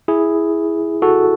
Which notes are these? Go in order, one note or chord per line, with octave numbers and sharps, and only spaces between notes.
E4 G#4
F#4 A4